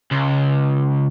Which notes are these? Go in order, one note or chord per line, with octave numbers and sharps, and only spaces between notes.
C#2